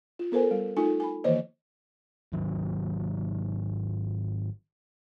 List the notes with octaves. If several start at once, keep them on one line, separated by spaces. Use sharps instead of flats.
F4
B3 A4 A#4 C5 G#5
G3
A3 D#4 F4 A4 G#5
G#5 B5
D#3 E3 A#3 C5 C#5 D#5
G#1 D#3 F#3